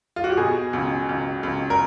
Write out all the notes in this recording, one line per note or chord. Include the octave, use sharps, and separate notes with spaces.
F4
F#4
G4
B2 G#4
C#2
C#2
C#2
A#4